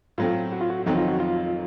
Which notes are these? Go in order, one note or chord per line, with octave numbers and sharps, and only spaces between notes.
A2 F#3 A3 C4 F4
F#4
F4
F#4
F2 D#3 F#3 C4 D#4 F#4
F4
F#4
F4